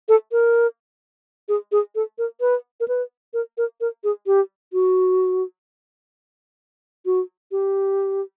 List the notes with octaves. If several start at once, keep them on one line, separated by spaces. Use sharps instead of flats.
A4
A#4
G#4
G#4
A4
A#4
B4
A#4
B4
A#4
A#4
A#4
G#4
G4
F#4
F#4
G4